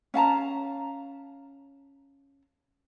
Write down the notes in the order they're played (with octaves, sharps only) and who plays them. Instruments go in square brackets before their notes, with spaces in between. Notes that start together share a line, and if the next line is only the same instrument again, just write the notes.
[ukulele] C#4 F5 A5 A#5